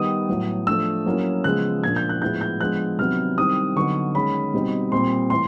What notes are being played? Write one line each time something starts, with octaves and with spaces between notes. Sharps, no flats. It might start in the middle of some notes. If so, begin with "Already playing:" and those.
Already playing: D#3 G3 B3 D#4 D#6
A2 F#3 B3
F3 A3 D4 E6
F#3 A#3 C#4 E4
C#3 F3 G#3 B3 F#6
A#2 F3 A#3 D4 G#6
G6
F#6
A2 F3 G#3 B3 E4 G6
G6
F3 G#3 B3 D4 F#6
C3 D#3 F#3 B3 D4 F6
D#3 G3 C4 E4 D#6
D3 F#3 B3 D#4 C#6
D#3 G#3 C#4 B5
B2 G3 C4 D#4
A#2 G3 C4 C6
A2 E3 C6